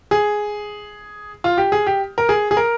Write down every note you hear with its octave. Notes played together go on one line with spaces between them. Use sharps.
G#4
F4
G4
G#4
G4
A#4
G#4
G#4
A#4